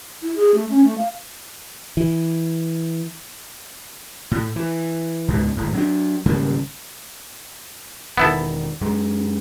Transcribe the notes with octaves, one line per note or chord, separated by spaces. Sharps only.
E4
G#4
A3
C#4
A3
F5
E3
A2
E3
C#2 G#2 B2
D1 G#1 A2
F#3 C4 D4
G#1 C#3 G3 A#3
E1 D#3 B3 E4 A4
F#2 G#3